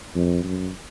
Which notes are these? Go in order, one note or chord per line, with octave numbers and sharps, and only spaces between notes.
F2
F#2